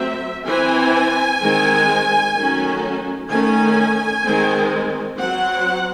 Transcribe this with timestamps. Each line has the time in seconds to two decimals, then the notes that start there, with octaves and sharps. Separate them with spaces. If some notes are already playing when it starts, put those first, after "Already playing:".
Already playing: F#3 A3 C4 E5
0.46 E3 C4 G#5
1.41 D#3 G#3 C4
2.36 D#3 F#3 A3 C#4
3.30 D#3 A3 C#4 G#5
4.23 D#3 G#3 C4
5.18 F#3 C4 F#5